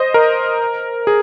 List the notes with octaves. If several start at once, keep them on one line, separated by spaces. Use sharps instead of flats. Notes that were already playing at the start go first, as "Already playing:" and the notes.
Already playing: C5 D#5
A#4
G#4